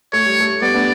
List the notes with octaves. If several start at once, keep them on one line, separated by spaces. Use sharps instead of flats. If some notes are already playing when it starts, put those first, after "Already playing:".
A3 C#5
G3
A3
G3 B3 D5
B3 D4